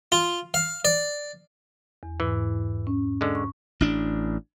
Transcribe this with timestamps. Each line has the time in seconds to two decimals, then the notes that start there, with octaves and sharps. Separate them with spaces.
0.12 F4
0.54 F5
0.85 D5
2.03 E2
2.20 G#2 E3
2.87 C#4
3.21 D3 G#3
3.35 C#6
3.81 A1 D4